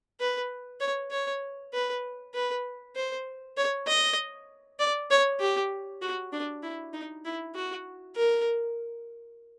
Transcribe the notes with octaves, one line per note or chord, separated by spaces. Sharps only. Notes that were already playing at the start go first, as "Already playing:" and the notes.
B4
C#5
C#5
B4
B4
C5
C#5
D#5
D5
C#5
G4
F#4
D4
E4
D#4
E4
F#4
A#4